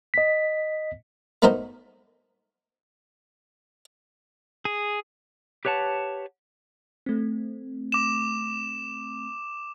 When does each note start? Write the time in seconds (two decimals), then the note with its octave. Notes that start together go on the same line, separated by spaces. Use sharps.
0.14 D#5 B6
1.42 A3 B3 D#4 F#4 A#4 C5
4.65 G#4
5.65 G4 B4 C#5 F#5 A5
7.06 A3 C4
7.92 D6 E7